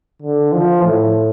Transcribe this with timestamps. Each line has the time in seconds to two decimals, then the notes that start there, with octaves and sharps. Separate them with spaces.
0.22 D3
0.52 F3
0.83 A2